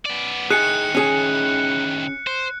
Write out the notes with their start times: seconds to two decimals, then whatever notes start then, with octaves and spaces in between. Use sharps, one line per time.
0.05 B3 D5
0.50 A2 D#3 G#4 F#6 C#7
0.95 C#4 G#4
2.27 C5